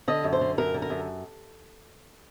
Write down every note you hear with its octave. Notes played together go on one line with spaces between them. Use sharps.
D3 D#5
F#2
C5
D3
F#2 A#4
D3
A#4
F#2